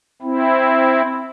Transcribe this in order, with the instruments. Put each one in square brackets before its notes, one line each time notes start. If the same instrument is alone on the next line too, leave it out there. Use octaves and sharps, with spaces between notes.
[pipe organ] C4 E4